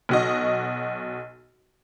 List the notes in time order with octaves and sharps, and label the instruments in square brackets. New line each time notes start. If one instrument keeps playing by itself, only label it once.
[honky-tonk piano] B1 F#4 D#5